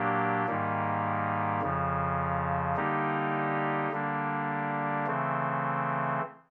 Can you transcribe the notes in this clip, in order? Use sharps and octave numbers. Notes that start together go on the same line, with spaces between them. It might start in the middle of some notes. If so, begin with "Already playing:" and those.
Already playing: A#2 F#3 A#3 D4 G4
G#2 D#3 G3 A#3
F2 C#3 F3
D3 G3 A#3 D#4 G4
D3 G3 A#3 D4
C#3 E3 A3 C4